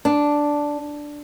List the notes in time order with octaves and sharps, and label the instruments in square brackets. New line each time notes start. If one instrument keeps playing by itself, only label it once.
[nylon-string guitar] D4